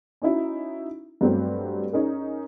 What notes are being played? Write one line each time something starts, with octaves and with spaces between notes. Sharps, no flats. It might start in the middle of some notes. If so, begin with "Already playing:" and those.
C#4 D#4 E4 F#4
G2 F#3 A3 C4 G4
C#4 D#4 G#4 A#4